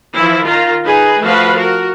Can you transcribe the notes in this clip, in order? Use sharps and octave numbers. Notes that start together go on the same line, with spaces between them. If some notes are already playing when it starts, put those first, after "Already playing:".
E3 F3 E4
D#3 F4 A#5
D#4 G#4 B4
F3 A3 F#4 B4 F5
F#4 A#4